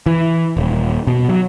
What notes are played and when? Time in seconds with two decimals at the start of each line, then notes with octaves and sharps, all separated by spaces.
0.06 E3
0.57 D#1
1.07 B2
1.29 F#3